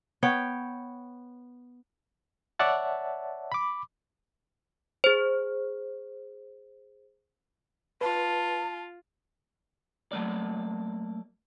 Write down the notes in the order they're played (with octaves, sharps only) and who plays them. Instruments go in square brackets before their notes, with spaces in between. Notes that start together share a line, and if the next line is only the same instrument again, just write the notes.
[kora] B3 C#5 G5
[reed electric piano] C#5 D5 E5 F#5 A5
B5 D6
[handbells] G#4 C5
[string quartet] F4 [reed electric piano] B4 [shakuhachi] A5
[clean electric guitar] F#3 A3 A#3 D5